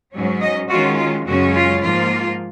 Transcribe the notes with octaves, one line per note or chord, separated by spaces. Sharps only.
G#2 F#3 C#4
D#5
D#3 G#3 C#4 F4 F#4
F4
F#2 C#3 G#3 C#4 F#4
F4
G#2 F3 A#3 F4